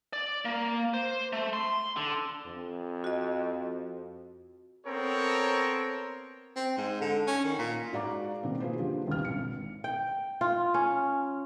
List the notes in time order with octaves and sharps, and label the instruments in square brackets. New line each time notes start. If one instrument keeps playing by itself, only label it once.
[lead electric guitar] D5
A#3
C5
A3
C6
D3
[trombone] F2
[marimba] F#4 D#5
[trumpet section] B3 C4 A4 A#4 C#5
[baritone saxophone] C4
G#2
D3
C#4
D#3
A#2
[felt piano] G#2 F#4 D5 F5 A#5 D6
B2 D#3 A#3 C4
A#3 F4 G#4 B4 C5
D3 F3 G4
G#1 D#2 B2 D3 B4 F6
G#1 C#7
[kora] G5
F4
C#4